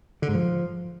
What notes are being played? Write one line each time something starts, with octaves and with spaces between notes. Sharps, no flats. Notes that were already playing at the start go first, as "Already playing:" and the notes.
D3
G#2
F3